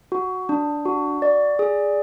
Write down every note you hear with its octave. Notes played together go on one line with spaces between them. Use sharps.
F#4
D4
F#4
D5
G#4